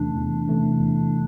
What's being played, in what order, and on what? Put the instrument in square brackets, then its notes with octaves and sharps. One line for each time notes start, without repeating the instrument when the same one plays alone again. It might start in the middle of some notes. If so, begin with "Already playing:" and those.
Already playing: [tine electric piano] E2 C3 E3 A3 C#4 [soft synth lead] D4
[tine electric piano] E2
C3 E3 A3 C#4
E2